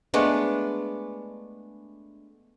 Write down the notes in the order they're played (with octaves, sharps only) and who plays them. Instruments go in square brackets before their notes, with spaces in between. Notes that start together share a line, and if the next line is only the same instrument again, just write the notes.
[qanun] G#3 A3 B3 D4